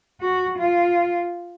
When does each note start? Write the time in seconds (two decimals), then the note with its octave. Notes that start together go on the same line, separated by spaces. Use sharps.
0.20 F#4
0.58 F4